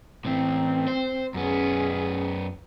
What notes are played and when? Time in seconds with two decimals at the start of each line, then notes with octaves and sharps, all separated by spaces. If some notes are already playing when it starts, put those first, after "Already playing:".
0.25 A2 E3 C4
0.88 C5
1.34 F#2 B3 C#4 G#4